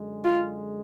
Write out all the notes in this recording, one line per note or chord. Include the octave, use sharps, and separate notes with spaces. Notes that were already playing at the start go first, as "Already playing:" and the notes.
Already playing: F#2 D3 G#3
F4